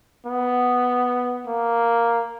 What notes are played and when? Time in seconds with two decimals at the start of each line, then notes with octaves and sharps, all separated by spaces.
0.27 B3
1.47 A#3